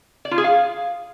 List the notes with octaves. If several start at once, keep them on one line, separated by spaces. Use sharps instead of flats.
D5
F4
G#4
F5